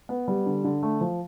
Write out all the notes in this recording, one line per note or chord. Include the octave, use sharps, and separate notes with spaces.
B3
G3
D3
D3
A3
F3